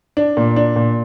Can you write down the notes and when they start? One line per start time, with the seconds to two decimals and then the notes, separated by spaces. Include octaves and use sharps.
0.17 D4
0.37 A#2
0.56 D4
0.76 A#2